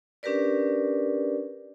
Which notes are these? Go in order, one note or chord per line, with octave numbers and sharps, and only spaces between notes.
C#4 D4 G4 A#4 B4 D5